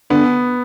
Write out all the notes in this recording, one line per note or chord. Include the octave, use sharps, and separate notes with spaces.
D3 B3